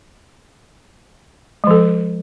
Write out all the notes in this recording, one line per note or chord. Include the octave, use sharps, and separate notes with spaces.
F3 G#3 A4